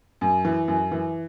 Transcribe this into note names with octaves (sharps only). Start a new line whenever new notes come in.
F#2
E3
F#2
E3